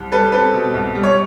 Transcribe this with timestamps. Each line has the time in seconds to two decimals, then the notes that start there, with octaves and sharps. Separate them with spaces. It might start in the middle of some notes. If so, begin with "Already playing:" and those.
Already playing: C2
0.12 G3 A4 B4
0.32 C4 A4 B4
0.54 B2
0.74 C2
0.95 G3
1.03 C#5